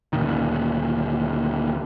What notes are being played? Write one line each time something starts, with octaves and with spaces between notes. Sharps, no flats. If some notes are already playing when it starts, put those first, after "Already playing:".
D2 A#2 D#3